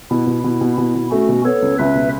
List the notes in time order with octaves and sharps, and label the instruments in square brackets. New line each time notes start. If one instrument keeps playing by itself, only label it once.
[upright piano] B2 [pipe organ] E4
[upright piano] B2
[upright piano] B2 [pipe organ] E4
[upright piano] B2
[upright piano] B2 [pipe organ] E4
[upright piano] B2
[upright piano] A3 [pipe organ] C#4 F#4
[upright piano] B2
[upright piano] B3 [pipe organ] A4 C#5
[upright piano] C#2
[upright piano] C#2 [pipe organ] B4 E5
[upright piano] B2